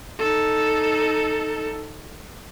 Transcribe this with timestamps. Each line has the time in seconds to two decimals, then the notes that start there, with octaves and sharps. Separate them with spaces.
0.19 D#4 A4